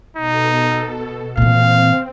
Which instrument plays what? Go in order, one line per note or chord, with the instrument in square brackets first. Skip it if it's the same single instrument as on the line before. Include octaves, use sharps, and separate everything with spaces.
[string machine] B2 A4 [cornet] D#4
[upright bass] A#2 E3 [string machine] C4 [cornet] F5